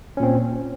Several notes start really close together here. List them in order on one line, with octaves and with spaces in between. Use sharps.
C#4 A#2 C4